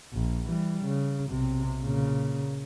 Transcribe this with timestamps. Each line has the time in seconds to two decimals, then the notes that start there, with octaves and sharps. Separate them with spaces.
0.14 A#1
0.48 E3 G3
0.85 C#3
1.28 B1 C3
1.81 A#2 C#3